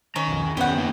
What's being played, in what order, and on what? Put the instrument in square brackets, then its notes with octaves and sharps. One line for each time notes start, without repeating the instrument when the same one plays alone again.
[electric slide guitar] D#3 A#5 [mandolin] C#4
[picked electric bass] B1 F2
E2
[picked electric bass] F#2 B3 [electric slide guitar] D#3 C#4 [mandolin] G4 F#5
[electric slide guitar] A#3 D#4